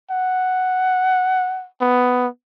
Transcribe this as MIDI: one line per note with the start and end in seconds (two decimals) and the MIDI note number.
0.11 1.67 78
1.81 2.27 59